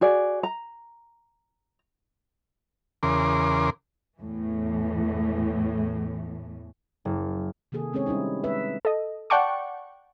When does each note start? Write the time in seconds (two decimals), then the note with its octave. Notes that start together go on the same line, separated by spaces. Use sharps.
0.01 F#4 G#4 D5
0.43 A#5
3.03 E2 C#3 A#4 C6 D6
4.18 E2 A2 E3
7.05 F#1
7.72 C3 D#3 A#3 G#4 A4
7.93 G#3 C4 C#4 G#4 C#5
8.06 G3 C#4 D#4 E4
8.43 G#3 B4 E5
8.85 A4 D#5
9.30 D5 F#5 G5 A5 C#6 D6